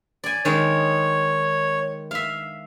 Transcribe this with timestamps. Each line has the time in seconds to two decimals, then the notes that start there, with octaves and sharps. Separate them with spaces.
0.24 D5 G#5
0.45 D#3 G#3 C#5
2.11 E5 F5